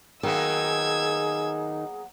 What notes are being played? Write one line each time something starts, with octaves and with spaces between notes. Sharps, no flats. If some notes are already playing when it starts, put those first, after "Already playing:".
D#3 F#3 A#3 B3 G#4 E6 G#6